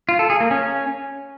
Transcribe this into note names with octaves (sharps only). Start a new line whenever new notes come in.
F4
A4
G#4
A#3
C#4